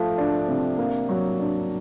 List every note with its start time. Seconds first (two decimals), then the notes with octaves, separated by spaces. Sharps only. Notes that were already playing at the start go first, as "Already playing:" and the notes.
Already playing: F3 A3
0.18 D4
0.48 C3
0.78 A#3
1.09 F#3
1.39 D4